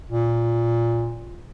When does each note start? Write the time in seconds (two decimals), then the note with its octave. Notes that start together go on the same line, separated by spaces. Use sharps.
0.10 A#2